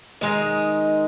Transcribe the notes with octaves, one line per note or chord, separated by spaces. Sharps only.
D#3 G#3 D#4 D#5